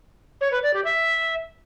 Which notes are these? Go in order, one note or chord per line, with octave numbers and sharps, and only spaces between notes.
C#5
B4
D5
G4
E5